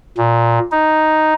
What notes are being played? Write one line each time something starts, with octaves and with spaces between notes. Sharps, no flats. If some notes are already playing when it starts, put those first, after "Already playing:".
A#2
D#4